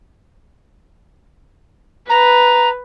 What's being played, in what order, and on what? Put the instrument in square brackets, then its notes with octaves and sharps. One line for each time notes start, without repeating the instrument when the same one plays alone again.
[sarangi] B4 [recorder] A#5